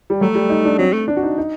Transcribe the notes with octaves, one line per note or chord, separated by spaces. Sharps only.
G3
F#3 A3
G3
D#4
D4
F#3 C4
A3
D4
F#4
D#4
D#4